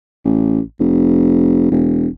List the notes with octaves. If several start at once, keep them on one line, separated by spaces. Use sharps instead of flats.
A1
F1
E1